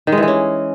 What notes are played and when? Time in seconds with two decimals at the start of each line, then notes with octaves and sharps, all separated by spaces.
0.07 D#3
0.12 G#3
0.17 E3
0.23 G#3
0.28 C#4